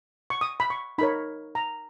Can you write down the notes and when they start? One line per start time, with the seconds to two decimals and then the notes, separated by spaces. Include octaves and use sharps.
0.30 C#6
0.41 D#6
0.60 B5
0.70 C#6
0.98 D#4 A#4 C#5 B5
1.55 A#5